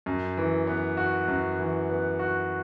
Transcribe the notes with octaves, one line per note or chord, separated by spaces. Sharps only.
F#2
E3
B3
F#4
F#2
E3
B3
F#4